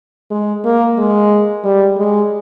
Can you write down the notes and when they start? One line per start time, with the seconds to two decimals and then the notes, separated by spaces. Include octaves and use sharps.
0.31 G#3
0.65 A#3
0.98 G#3
1.64 G3
1.97 G#3